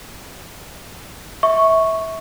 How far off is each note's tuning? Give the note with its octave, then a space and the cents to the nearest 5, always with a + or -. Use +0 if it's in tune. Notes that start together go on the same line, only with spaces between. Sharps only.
E5 -25 C#6 +0